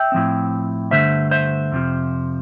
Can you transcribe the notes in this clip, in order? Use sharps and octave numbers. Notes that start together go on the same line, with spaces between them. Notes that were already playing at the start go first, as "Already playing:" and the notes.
Already playing: E5 G5
A2 F3 C4
G2 D3 A3 D4 C5 E5
C5 E5
F2 C3 F3